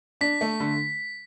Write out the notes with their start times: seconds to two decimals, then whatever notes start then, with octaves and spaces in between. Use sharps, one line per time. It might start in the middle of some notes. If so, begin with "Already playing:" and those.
0.21 D4 B6
0.41 A3
0.60 D3